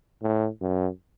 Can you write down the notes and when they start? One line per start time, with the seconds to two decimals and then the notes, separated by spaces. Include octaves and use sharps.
0.22 A2
0.61 F#2